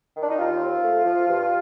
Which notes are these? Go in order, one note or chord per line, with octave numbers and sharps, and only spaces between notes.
D#3
D4
D#4
D#2 F4
C4
A3
F3
G2